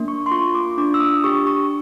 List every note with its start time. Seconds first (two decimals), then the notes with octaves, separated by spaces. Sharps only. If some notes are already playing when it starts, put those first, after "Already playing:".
Already playing: A#3 D4
0.08 C#6
0.26 C6
0.31 F4 C#6
0.55 D6
0.78 D4 D6
0.94 E6
1.00 D#6
1.24 G4 C#6
1.47 C#6